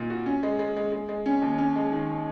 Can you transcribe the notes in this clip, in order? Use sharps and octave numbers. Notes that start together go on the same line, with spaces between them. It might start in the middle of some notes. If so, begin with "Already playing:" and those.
Already playing: A#2 A#3 D#4
F#4
C#4
G#3
G#3
G#3
G#3
G#3
C#4
D#2
C#4
G#3
D#3